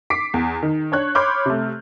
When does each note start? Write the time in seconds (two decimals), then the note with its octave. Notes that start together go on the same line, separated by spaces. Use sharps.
0.10 D6 B6 C7 D7
0.34 E2
0.63 D#3
0.92 D4 C#5 F#6
1.15 C#5 B5 C6 D6 F6 G6
1.46 C3 A3